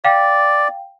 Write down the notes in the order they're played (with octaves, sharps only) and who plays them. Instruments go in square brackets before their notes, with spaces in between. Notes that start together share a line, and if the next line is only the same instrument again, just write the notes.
[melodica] D5 [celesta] F5 G5